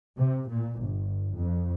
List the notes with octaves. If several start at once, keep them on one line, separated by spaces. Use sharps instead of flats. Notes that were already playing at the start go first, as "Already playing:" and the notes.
C3
A#2
G1
F2